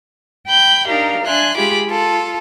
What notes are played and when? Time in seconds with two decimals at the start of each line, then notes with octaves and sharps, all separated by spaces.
0.48 G5 B5 G6
0.87 D4 D#4 G4 A#4 F5
1.25 D4 E5 G#5 C6 F#6
1.57 G#3 F4 G4 G#4 B5 D6
1.86 F4 A4